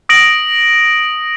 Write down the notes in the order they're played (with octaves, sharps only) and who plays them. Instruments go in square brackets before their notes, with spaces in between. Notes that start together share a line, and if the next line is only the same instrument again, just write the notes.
[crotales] D#6 A#6 D7 F#7